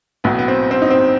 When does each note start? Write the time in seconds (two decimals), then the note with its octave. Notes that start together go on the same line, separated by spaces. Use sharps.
0.24 B1 A2 F#3 B3
0.39 B3
0.48 C4
0.71 C4
0.82 D#4
0.90 C4